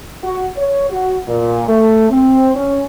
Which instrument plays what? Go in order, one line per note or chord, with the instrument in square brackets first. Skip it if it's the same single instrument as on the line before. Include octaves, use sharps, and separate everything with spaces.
[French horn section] F#4
C#5
F#4
A#2
A3
C4
C#4